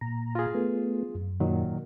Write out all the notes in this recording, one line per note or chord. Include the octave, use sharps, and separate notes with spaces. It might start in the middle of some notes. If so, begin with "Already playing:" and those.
A#2 A#5
F4 G#4
A3 B3
F#2
A#2 D#3 F#3